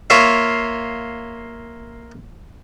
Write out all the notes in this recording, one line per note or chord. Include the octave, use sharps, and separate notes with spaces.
A#3 F4 C#5 E5 F5